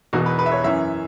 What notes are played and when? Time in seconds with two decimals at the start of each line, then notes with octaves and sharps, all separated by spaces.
0.13 E1 E2 B2 F#4
0.26 B4
0.39 B4
0.46 E5
0.52 C#5
0.64 F#2 E3 C#4 E5